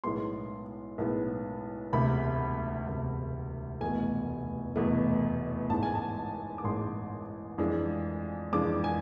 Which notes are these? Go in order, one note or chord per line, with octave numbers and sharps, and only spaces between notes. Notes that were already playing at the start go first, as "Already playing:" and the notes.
B1 A2 G#3 B3 C6
B1 A2 G#3 B3
E1 D2 C3 B5
E1 D2 C3
F1 E2 B2 A3 G#5
F1 E2 B2 A3
A1 G#2 G#3 A5
G#5
A5
D6
A1 G#2 G#3 C6
F2 E3 G#3 D4
F2 E3 G#3 D4 D6
G#5